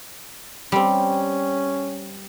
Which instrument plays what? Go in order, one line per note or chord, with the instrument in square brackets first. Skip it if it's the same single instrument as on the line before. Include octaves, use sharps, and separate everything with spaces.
[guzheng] G3 C4 [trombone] C#4